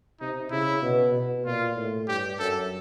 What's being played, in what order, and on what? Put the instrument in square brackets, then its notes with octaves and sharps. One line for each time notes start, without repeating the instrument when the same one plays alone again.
[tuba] C3 [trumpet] D#4
[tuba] C#3 [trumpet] E4
[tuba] B2
B2
[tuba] A#2 [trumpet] F4
[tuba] A2
[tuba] G2 [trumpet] G4
[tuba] F#2 [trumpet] A4